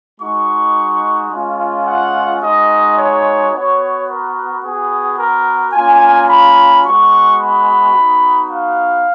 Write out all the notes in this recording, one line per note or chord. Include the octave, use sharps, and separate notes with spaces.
G#3 D#4 F#4 C#6
G#3 C#4 F4
F#5
G#3 D#4 F#4 D#5
C#5
B3 F#4 C#5
A#4
B3 F#4 G#4
A#4
A#3 C#4 F4 G#5
B5
G#3 B3 F#4 C#6
B5
B3 D#4 F#4
F5